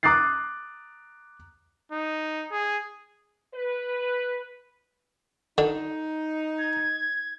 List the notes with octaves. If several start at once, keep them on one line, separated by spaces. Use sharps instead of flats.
A#5 D6 D#6 F#6 A6 C7
D#4
G#4
B4
D3 D#4
G#6